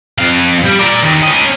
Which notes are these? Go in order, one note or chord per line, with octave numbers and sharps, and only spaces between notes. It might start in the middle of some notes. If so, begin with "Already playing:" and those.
F2 F5
G3
A#4 D5
D#2
C#4 D#5